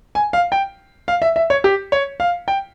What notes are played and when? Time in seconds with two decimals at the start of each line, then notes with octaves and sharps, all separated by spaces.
0.15 G#5
0.33 F5
0.52 G5
1.08 F5
1.22 E5
1.36 E5
1.50 C#5
1.64 G4
1.92 C#5
2.20 F5
2.48 G5